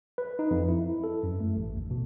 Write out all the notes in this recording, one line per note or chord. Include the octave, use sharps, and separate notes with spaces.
B4
D#4
F2
E4
A4
F#2
A3
A1
D#2
B2